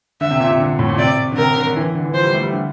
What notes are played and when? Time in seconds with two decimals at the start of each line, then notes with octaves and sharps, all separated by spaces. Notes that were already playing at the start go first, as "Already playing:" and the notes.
0.21 D3 E5
0.31 C3
0.40 A#2
0.50 C3
0.60 D3
0.79 A2
0.89 A#2
0.98 C3 D5
1.32 D3
1.37 C3 A#4
1.56 D3
1.67 D3
1.76 E3
1.95 D3
2.04 E3
2.14 F3 C5
2.23 G3
2.34 A3
2.43 G3
2.53 D3